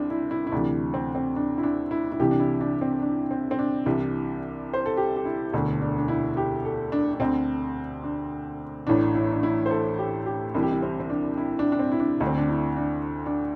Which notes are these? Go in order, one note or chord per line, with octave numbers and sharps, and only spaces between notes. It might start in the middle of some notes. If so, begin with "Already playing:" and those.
Already playing: C2 C4 D4
E4
E4
E4
D2 C3 E3 D4
C4
C4
D4
E4
D4
E4
E4
C2 C3 E3 G4
D4
E4
D4
C4
D4
C4
C4
D4
C2 C3 E3
C5
A4
G4
G4
E4
E1 D2 D3
D4
D4
E4
G4
A4
D4
D4
D2 D3 C4
D4
A1 A2 E3 D4
E4
D4
E4
C5
A4
G4
G4
C2 C3 E3 E4
G4
E4
C4
C4
D4
E4
D4
D4
C4
E4
D4
D2 D3
C4
D4
E4
D4
D4